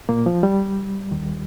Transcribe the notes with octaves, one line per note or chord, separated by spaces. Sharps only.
A#2 A#3
F3
G3
D#2 D#3